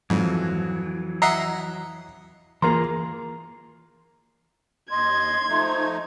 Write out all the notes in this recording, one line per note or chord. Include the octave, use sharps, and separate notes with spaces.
F2 G#2 E3 F#3
D#5 E5 F#5 A#5 C7
E3 A#3 F4 G#4 A#5 C6
D#2 D#5 C6 G#6
F3 A3 D#4